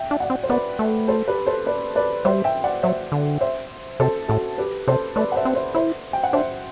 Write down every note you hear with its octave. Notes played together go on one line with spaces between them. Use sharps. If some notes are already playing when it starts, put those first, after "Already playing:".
Already playing: E5 G5
D4 E5
D5 F#5
C4
C5
B3 B4 D5
A3
A4 C5
G4 B4
A4 C5
B4 D5
B4 D5
G3 C5 E5
E5 G5
D5 F#5
F#3 C5 E5
D3
C5 E5
C3 A4 C5
A2 F#4 A4
G4 B4
C3 A4 C5
A3 B4 D5
F#5
C5 E5
C4
C5 E5
E4 C5 E5
G5
F#5
D4 C5 E5